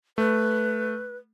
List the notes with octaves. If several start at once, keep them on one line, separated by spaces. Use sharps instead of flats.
A3 B4